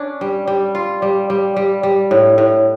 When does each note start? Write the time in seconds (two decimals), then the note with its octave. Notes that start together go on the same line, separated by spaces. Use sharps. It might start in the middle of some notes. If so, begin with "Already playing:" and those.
Already playing: C#4 D4
0.21 G3
0.47 G3
0.75 F4
1.02 G3
1.30 G3
1.56 G3
1.83 G3
2.11 A2
2.38 A2